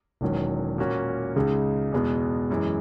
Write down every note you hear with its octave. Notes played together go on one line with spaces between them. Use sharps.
E1 E2 D#3 F#3 C#4
A#2 A#3 C#4 F#4
C#2 C#3 G#3 D#4
E2 B2 G#3 B3
F#2 E3 G#3